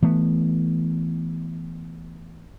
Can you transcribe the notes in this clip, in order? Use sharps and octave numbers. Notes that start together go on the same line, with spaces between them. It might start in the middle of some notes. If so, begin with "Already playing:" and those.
E3 A3 B3